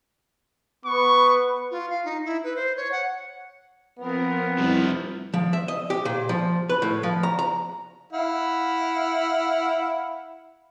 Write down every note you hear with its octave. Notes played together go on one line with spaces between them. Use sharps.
B3 B4 C#6
F4
F5
D#4
E4
B4
C5
C#5
F#5
F3 B3 C4 A#4
F2 C3 F3 G3 E4
F3
E5
D#5
G4
A#2
F3
B4
A2
F3
A#5
A#5
E4 F5 F#5